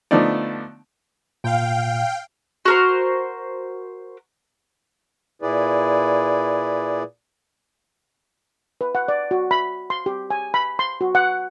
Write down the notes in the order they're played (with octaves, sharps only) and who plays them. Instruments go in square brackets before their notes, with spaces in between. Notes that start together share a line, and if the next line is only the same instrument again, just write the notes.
[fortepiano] D3 F3 A3 B3 D#4 D5
[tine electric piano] A#2 [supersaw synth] F5 G5
[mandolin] F#4 A#4 C5
[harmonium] A#2 E4 G#4 B4 D5
[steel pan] B4
F#5
D5
F#4
B5
C6
G4
G#5
B5
C6
F#4
F#5